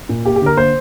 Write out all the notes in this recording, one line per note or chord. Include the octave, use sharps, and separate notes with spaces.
A#2
A#3 G4
G4
D3 A#4
A#3 C5